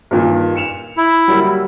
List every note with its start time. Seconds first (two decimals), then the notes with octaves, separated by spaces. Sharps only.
0.11 G2 A#2 D#3
0.56 C#7 E7 F7
0.97 E4
1.28 F#3 G3 A#3